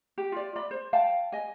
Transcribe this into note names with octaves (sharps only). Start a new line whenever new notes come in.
G4
F4 D5
D5 B5
C5
F5 G5 A5
D#5 G#5